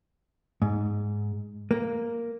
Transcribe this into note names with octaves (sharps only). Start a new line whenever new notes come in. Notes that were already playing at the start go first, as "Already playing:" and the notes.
G#2
A#3